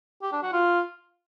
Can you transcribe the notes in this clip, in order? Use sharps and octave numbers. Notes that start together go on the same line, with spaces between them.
G4
D4
F#4
F4